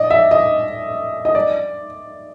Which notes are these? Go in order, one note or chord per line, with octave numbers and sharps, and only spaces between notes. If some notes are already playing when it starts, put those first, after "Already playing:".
Already playing: D5 D#5
E5
D#5
D#5
D5